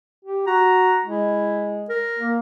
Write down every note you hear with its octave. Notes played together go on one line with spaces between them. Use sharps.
G4
F#4 A#5
G#3 E4
A#4
A#3